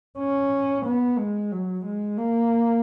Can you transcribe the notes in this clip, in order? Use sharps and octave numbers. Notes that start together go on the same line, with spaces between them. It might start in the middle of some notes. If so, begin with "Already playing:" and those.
C#4
B3
G#3
F#3
G#3
A#3